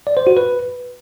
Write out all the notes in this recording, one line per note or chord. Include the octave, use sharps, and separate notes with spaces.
D5
C5
F#4
B4